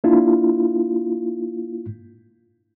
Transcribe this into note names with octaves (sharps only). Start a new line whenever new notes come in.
A#3 D4 E4 F4